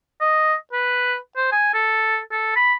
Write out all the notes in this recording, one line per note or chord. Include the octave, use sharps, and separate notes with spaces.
D#5
B4
C5
G#5
A4
A4
B5